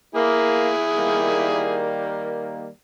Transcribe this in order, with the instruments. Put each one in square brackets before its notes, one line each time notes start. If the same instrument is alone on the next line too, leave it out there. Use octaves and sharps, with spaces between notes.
[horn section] A#3 [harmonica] E4 G#4
[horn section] D#3 G3 A#3